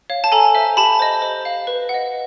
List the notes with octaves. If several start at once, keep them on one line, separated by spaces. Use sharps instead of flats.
C#5 F5
A5
A4 G#5 A#5
C5 E5
G4 A5 B5
C5 D#5
C5
F5
B4
F#5
D#5